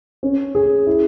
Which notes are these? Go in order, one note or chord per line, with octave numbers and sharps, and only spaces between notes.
C#4
G#4
E4